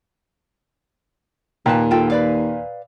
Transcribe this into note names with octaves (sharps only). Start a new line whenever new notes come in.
D#2 A#2 G4 B4 A5
F4 A4 G5
B4 D5 F5